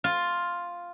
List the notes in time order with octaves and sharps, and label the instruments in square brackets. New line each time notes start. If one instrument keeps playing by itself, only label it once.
[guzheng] F4